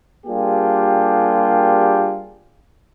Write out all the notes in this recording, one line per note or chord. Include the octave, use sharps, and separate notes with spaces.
G3 A#3 D4 F4 G4 G#4